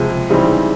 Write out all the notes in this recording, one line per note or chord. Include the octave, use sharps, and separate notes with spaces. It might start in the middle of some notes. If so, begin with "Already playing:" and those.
Already playing: C#2 C3 F3 G#3
C#3 E3 G3 C4 D#4